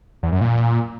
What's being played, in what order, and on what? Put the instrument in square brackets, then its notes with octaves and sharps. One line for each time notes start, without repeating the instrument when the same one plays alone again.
[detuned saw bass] E2
F#2
A#2